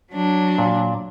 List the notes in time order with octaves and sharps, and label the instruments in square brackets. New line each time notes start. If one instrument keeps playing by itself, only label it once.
[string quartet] F#3 D4
[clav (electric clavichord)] A#2